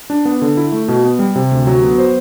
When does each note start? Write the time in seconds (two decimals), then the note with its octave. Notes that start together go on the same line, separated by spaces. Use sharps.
0.10 D4
0.25 B3
0.42 D3
0.57 E4
0.72 A3
0.88 B2
1.04 B3
1.19 G3
1.35 C3
1.51 D2
1.67 F#3
1.83 B3
1.98 C5